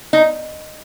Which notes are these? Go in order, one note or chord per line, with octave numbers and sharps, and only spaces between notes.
D#4